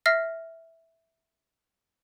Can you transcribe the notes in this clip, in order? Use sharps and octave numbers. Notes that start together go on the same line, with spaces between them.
E5 F6 A#6 C7